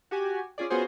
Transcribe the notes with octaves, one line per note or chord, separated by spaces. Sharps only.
F#4 G4 G#5
C#4 F4 G#4 D5
B3 C#4 F4 F#4 G#4 C5